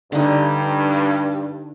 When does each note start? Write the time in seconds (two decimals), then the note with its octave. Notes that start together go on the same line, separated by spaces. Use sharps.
0.12 G2 D3 D#4